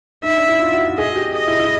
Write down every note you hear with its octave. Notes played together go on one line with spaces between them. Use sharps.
D#4 E5
D4
E4
F4
F#4
F#4
G#4 D#5
G4
D#5
E4
E4